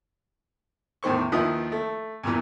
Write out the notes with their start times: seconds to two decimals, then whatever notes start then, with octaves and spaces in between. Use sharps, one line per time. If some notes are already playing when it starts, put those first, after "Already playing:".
1.03 E2 A2 D#3 C5 C#6
1.32 D#2 D#3 F3 E4 B4 D#6
1.72 A3
2.23 E2 G2 A#2 E3